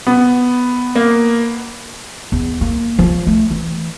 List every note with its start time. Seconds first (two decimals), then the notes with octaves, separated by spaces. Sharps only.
0.07 B3
0.95 A#3
2.32 E2
2.61 A#3
2.99 F3
3.27 A3
3.51 E3